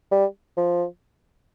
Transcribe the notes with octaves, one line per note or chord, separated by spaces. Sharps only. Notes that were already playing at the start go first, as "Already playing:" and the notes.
G3
F3